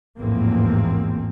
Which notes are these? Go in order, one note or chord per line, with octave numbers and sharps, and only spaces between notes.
A1 E2 G#2 F3 A#3 C4